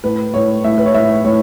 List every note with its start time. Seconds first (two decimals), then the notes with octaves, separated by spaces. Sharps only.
0.04 A2 B4
0.34 A2 C#5
0.64 A2 E5
0.78 B4
0.86 C#5
0.94 A2 E5
1.24 A2 C#5